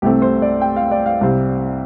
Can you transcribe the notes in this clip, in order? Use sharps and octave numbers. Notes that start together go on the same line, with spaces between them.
C2 C3 A3 C4 G4
C5
D5
G5
F5
D5
F5
C2 C3 G3 C4